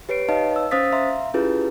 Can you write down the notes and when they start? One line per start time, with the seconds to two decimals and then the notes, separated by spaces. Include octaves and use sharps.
0.09 G4 B4 C#5 C7 D7
0.29 D#4 B4 C#5 D#5 F5 A5
0.56 E6
0.71 C#4 C5 F5 D#6 A6 B6
0.93 E5 F5 A#5 C6
1.34 C#4 E4 F4 G4 G#4 B4